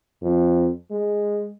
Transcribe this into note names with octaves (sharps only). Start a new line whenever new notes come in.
F2
G#3